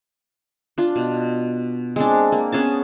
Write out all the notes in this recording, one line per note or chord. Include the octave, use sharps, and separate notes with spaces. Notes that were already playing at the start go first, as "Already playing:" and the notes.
D4 F4
B2
G#3 C4 D4
A#3
B3 C#4 G#4 A5